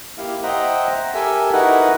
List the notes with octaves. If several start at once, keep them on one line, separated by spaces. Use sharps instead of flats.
A#3 E4 G4 F5
C5 D#5 E5 F#5 G5 A#5
G4 A4 A#4 E5 G#5 E6
D#4 E4 F#4 A#4 B4 F#5